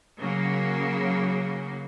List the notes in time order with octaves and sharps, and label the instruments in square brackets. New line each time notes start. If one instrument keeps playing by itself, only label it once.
[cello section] C#3 F#3 A#3